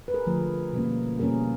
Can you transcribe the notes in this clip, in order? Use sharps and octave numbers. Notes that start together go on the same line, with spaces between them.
B4
G#4 A#4
D3 F3 A3
B2 G3 A#3 C#4
B2 G3 A#3 C#4 G#4 A#4